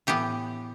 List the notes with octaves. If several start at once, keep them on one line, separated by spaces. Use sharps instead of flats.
A2 E3 B3 G4